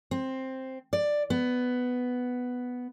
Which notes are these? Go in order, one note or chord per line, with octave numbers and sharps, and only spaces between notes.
C4
D5
B3